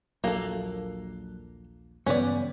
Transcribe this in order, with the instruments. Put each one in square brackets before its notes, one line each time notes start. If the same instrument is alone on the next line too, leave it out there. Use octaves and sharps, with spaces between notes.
[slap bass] A#1 D#2 [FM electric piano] F#3 [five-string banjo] A#3 A4
[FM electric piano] G2 B3 [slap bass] C#3 E3 F#3 [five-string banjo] C#4 D5